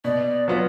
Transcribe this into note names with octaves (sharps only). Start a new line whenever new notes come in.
B2 D5
F#3 B3 F4